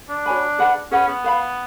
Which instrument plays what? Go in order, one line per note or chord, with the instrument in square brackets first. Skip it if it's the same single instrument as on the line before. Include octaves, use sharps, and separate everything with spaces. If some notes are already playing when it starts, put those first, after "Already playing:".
[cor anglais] D4
[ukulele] F#4 C#5 G#5 B5
G#4 B4 F#5 B5
[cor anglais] C#4 [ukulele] G#4 B4 F#5 B5
[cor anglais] B3
[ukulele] B4 F5 B5